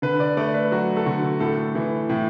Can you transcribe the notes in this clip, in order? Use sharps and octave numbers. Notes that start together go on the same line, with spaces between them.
D3 B4
D5
A3 D5
B4
F#3 F#4
A4
D3 F#4
A2 A4
E3
A2